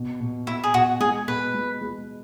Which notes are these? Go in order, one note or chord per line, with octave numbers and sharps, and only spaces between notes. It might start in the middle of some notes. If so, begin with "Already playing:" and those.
Already playing: B2
B2
B2 E4
G#4
B2 F#4
G#3 G#4
B2 B4
G#3
G#3